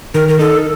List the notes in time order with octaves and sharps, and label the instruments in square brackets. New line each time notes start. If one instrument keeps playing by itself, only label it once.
[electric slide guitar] D#3 [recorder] A#4
[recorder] A#4
[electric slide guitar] D#4 [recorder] A4